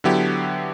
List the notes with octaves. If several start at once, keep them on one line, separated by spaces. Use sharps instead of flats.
D3 F#3 B3 E4 G4